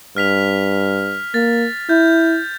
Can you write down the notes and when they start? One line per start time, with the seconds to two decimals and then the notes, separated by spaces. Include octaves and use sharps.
0.17 G2 F6 B6 F7
1.34 A#3 A6
1.89 E4 G6